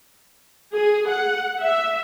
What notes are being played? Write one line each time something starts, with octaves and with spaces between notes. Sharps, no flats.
G#4
F#5
E5